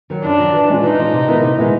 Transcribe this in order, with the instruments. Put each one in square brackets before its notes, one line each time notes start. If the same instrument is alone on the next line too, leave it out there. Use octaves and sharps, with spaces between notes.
[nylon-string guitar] D#3 F#3
[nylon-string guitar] F#2 [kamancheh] D4
[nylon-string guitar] D#3 F#3
E3
G#3 C#4 F4
[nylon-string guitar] E3 [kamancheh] D#4
[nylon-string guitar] G#3 C#4 F4
C3
D#3 G#3 B3 E4
C3
D#3 G#3 B3 E4